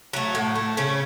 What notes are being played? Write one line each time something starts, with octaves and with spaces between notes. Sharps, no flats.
F#3 A3
A2
A3
C#3 C#4